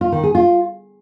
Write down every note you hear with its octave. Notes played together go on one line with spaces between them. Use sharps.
F4
D#3
G#4
F4